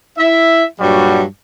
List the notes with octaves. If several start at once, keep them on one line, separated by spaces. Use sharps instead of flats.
E4 E5
G2 A#2 F#3 G3 F#4